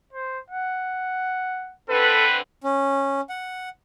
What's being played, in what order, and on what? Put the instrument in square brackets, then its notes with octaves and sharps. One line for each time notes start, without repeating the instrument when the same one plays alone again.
[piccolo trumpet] C5
F#5
[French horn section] D3 C4 B4 [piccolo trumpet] A4
[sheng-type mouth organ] C#4
F#5